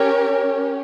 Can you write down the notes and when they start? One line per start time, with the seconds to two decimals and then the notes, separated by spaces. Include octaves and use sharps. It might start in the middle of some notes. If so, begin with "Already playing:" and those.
Already playing: C#4 G4 A#4 C#5